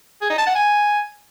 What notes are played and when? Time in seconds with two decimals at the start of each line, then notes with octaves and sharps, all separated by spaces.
0.22 G#4
0.30 D#4
0.38 A5
0.47 F#5
0.55 G#5